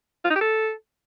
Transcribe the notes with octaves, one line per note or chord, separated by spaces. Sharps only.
F4
D#4
G4
A4